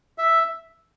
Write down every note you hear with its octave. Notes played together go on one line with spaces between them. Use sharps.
E5